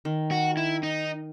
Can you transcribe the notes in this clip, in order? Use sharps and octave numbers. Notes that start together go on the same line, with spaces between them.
D#3
F#4
E4
D#4